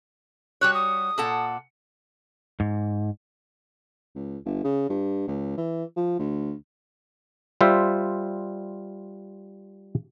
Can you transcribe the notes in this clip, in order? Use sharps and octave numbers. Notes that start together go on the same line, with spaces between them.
G3 F#4 C#5 F#6
D#6
A#2 A4 F#5
G#2
C#2
G1
C#3
G2
C#2
E3
F3
D2
G3 F4 C5 E5